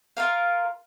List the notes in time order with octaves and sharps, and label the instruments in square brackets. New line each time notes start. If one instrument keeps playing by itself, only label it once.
[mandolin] F4 A#4 F5